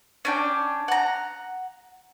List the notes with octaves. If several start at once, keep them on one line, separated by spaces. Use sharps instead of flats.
C#4 D4 G5
F#5 A#5